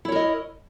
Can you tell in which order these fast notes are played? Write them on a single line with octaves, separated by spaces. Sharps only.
E4 C#5 A#4 D#5